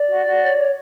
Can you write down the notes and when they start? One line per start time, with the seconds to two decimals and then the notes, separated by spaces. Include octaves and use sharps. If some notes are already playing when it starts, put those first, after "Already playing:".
Already playing: D5
0.09 F#4
0.26 F#4
0.42 C#5
0.58 C#5